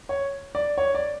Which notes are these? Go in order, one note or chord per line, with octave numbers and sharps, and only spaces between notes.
C#5
D5
C#5
D5